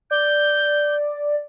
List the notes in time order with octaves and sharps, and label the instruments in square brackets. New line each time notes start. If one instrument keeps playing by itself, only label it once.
[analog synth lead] D5 [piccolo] G6